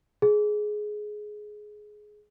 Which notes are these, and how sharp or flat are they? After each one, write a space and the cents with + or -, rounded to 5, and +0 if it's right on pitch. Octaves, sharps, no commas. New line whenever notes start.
G#4 +15